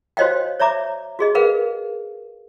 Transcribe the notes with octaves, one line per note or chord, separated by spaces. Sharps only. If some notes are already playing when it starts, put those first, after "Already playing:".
F#4 C5 C#5 D#5 F5 G5
C#5 D5 E5 A#5 D6
F#4 G#4 D#5
G#4 A#4 B4 F5 F#5